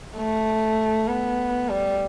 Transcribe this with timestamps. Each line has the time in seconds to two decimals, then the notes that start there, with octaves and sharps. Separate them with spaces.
0.17 A3
1.08 B3
1.69 G3